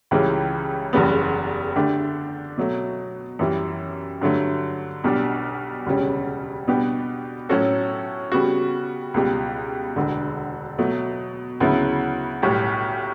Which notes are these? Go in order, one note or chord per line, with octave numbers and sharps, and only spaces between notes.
C#2 C#3 E3 G3 C#4
F#1 E2 C#3 G3 B3
D3 A3 D4 G4
B2 F#3 A3
F#2 E3 G3
G2 D3 F#3 A3
B1 B2 G3 D4
E1 D2 C#3 G3 C#4
B2 G3 B3 D4 G4
A2 F#3 C#4 F#4 A4
C#3 G3 B3 F#4
C#2 B2 G3
E1 D2 D3
B2 F#3 A3
D2 C#3 F#3 B3 E4
B1 A2 G3